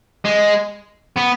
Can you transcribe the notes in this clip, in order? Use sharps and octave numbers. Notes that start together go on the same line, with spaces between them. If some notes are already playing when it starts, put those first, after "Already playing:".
G#3
B3